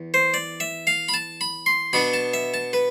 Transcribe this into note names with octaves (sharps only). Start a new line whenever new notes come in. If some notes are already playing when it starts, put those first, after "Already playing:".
Already playing: E2
C5
D5
E5
F5
B5
A5
B5
C6
B2 B3 D4 B5
A5
E5
A5
B4